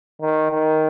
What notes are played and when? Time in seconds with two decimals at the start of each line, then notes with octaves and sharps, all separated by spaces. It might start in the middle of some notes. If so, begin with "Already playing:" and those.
0.21 D#3
0.51 D#3